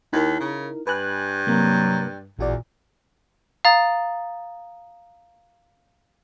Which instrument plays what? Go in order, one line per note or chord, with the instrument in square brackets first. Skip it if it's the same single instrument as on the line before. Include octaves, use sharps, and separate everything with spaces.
[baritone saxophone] D#2 [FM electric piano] D#4 E4 A#4
[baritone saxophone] C#3
[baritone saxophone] G2 [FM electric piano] B4 G#5 F#6
[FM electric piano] C3 A#3 [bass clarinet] F#3
[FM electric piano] A1 F#4 D5 [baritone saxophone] E2 [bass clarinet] A#2
[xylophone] F5 A#5 D#6 A6